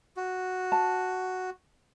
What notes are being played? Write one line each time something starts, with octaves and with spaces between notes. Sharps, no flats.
F#4
A5